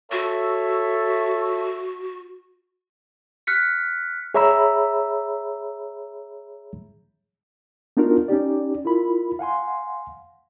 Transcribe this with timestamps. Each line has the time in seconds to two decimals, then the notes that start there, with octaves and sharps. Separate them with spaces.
0.12 F#4 A4 C#5 E5
3.47 F6 F#6 B6 C#7
4.34 G#4 C#5 E5 A#5 B5 E6
7.97 B3 D4 D#4 F4 F#4 A#4
8.28 C#4 D#4 G4 D5
8.85 E4 F4 A#4 B5
9.39 F5 F#5 G#5 C6